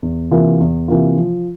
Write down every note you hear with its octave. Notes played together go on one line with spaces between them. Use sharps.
E2
C3 E3 A#3 F4
E2
C3 E3 A#3 F4
F3